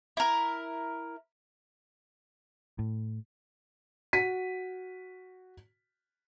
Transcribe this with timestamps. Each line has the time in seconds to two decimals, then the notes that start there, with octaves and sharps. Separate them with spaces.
0.17 E4 A#4
2.79 A2
4.13 F#4 B6 D#7